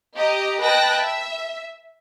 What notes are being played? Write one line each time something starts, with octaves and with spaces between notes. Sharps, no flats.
G4 D#5 A#5
B4 D#5 G5 A5 F#6 A#6
E5